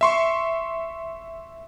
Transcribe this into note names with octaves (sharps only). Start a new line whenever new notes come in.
E5 C6 C#6